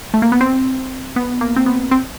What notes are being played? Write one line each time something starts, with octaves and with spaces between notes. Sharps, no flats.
A3
A#3
B3
C4
B3
A#3
C4
B3
C4